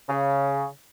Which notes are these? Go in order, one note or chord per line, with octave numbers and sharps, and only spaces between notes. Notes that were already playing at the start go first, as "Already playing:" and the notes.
C#3